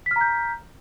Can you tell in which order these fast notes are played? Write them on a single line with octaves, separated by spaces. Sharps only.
B6 F6 A#5 G6